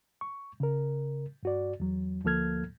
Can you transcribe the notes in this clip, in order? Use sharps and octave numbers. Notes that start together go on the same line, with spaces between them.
C#6
C#3 A#4
G2 F#4 D5
E2 F#3
D2 F3 A#3 A4 F6 G#6